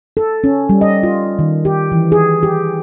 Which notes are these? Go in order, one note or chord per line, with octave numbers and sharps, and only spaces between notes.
A4
C#4
G3
D#5
F4
D#3
G4
E3
G#4
G4